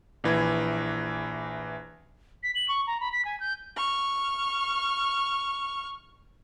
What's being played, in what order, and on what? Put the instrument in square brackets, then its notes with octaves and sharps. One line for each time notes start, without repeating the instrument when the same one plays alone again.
[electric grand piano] A#1 E3 B5 G#6
[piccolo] B6
F#7
C#6
A#5
B5
B6
G#5
G6
[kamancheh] C#6 F6